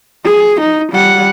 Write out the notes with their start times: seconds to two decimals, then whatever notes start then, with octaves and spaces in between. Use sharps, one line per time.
0.24 G#4
0.61 D#4
0.92 G3 F#5